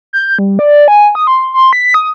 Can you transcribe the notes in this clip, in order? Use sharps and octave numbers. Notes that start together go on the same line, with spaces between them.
G6
G3
D5
G#5
D#6
C6
C6
B6
D#6